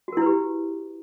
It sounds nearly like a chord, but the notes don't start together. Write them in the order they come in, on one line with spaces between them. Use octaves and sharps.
F#4 A#4 E4 B4 G4